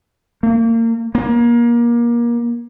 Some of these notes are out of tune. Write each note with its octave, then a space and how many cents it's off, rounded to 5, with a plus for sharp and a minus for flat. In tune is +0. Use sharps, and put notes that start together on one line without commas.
A#3 -30
A#3 +25